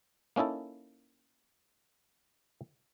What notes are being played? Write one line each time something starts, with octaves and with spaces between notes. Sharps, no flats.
A#3 C#4 D#4 E4 A4